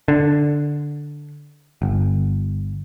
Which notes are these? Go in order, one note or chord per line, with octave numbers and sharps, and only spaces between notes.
D3
G1